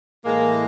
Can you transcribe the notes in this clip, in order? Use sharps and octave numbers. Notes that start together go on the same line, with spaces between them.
A2 E3 G#3 A#3